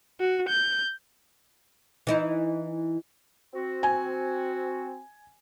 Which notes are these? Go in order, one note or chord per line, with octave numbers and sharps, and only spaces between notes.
F#4
G6
E3 D#4 E4
C4 F#4
G#5